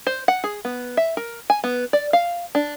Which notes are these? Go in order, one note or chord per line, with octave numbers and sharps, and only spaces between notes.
C5
F#5
G#4
B3
E5
A#4
G#5
B3
D5
F5
D4